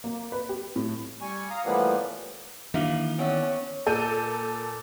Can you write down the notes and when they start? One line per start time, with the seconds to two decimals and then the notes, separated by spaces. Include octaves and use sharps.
0.04 A#3
0.32 B4
0.49 G4
0.76 A2
1.21 G3 G#5 C#6
1.50 F5 A#5 D#6
1.65 A2 E3 F3 G3 A#3 B3
2.74 D#3 E3 A#3 D4 F#4 E5 F5 D6
3.19 B3 C#4 D5 E5 F#5
3.86 A#2 A4 A#4 G6 D#7